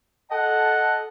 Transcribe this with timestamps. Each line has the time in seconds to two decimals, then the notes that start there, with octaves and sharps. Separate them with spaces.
0.30 A4 D#5 F#5 A5